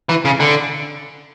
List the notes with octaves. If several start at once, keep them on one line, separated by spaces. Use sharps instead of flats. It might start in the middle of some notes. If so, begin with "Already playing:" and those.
E3
C#3
D3